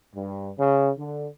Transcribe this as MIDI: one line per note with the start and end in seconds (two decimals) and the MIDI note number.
0.14 0.50 43
0.58 0.90 49
0.98 1.28 50